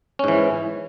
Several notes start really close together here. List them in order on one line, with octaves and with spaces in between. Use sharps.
C#4 G#2 E3